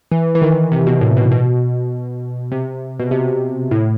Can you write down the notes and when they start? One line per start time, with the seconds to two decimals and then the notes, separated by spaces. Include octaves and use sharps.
0.11 E3
0.35 E3
0.42 D#3
0.72 C3
0.87 B2
1.01 A2
1.17 B2
1.31 B2
2.52 C3
2.99 B2
3.11 C3
3.71 A2